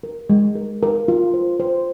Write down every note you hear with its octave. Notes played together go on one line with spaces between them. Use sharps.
A#4
G#3
A#4
A#4
F4
C5
C5